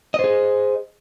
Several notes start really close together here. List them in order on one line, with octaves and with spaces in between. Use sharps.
D#5 C5 G#4